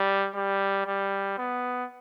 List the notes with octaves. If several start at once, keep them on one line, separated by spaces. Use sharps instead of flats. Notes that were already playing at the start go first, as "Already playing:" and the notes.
Already playing: G3
G3
G3
B3